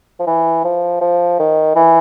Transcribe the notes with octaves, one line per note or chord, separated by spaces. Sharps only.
F3
E3
F3
F3
D#3
E3